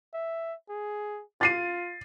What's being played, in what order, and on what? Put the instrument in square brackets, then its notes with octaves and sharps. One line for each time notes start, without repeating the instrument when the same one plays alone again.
[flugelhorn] E5
G#4
[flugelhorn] F4 [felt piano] A6 C7 D#7